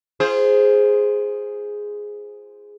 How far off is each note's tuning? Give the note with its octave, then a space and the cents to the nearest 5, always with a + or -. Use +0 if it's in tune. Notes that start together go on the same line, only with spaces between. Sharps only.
F4 -35 G#4 +0 C5 +0